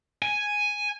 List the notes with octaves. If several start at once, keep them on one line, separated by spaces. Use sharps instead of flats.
G#5